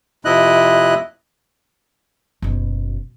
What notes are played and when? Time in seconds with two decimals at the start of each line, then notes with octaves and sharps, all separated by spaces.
0.25 F2 C3 E4 D#5 F#6
2.42 F#1 B2